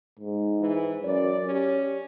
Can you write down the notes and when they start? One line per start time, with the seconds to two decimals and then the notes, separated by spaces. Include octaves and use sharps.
0.20 G#2
0.61 E3
1.04 F#2 D5
1.45 C#4 G4